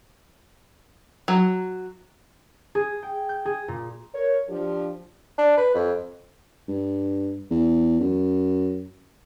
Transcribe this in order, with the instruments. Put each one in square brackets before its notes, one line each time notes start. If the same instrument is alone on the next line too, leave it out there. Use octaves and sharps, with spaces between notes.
[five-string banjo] F#3
[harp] G#4
G5
G6
G#4
A#2
[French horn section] A#4 C#5
F3 D4 G4
[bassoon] D4
B4
F2
[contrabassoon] G2
E2
F#2